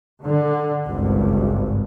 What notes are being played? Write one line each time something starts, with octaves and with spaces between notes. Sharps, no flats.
D3
G#1 C#2 G2